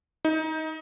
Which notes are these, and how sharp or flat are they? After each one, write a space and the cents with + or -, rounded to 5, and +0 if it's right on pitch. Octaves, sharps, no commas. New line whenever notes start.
D#4 +25